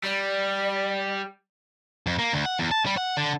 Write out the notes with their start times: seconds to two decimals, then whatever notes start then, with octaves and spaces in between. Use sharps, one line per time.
0.03 G3 D5
2.07 F2
2.19 A#3
2.33 D2
2.45 F#5
2.59 E2
2.71 A5
2.86 G3
2.97 F#5
3.17 D3